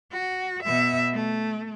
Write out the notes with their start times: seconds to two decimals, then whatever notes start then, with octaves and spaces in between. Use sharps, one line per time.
0.12 F#4
0.64 B2 E5
1.13 A3